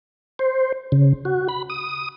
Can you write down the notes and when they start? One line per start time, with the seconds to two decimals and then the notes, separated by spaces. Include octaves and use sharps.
0.39 C5
0.92 C#3
1.25 F#4
1.49 B5
1.70 D#6